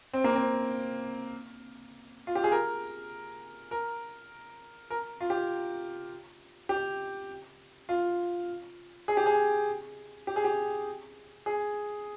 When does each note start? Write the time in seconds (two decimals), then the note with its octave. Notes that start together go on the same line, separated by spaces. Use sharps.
0.13 C4
0.24 A#3
0.36 C4
2.27 F4
2.35 G4
2.44 G#4
2.52 A#4
3.71 A#4
4.90 A#4
5.21 F4
5.30 G4
6.69 G4
7.89 F4
9.08 G#4
9.17 G4
9.26 G#4
10.27 G4
10.36 G#4
10.44 G4
11.46 G#4